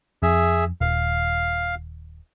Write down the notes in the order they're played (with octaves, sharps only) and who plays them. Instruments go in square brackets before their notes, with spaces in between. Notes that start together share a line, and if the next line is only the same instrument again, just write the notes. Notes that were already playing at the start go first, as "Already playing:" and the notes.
[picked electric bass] F2 [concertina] G#4 E5
[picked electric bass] D#1 [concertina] F5